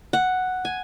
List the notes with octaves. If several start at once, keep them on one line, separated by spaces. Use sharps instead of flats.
F#5
G#5